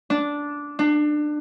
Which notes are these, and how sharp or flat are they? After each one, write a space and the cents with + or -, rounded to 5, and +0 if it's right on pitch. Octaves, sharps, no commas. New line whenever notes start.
D4 -10
D4 +25